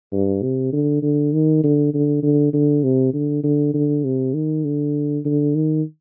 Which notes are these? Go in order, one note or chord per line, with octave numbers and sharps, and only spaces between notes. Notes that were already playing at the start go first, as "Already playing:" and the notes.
G2
C3
D3
D3
D#3
D3
D3
D3
D3
C3
D3
D3
D3
C3
D#3
D3
D3
D#3